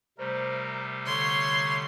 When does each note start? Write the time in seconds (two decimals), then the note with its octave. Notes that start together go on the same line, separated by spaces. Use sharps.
0.18 C3 G3 A3 A#4 C5
1.06 D3 C#5 C6